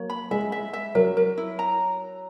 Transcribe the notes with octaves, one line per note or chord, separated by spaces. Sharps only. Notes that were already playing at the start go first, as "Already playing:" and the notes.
Already playing: F#3 A#3 C#5
B5
G#3 E5
E5
E5
F#3 A#4
A#4
E4
A#5